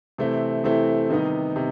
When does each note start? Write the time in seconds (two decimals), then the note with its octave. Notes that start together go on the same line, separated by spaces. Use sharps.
0.18 C3 E3 A3 C4 E4
0.64 C3 E3 A3 C4 E4
1.10 C3 D#3 G3 B3 D#4
1.56 C3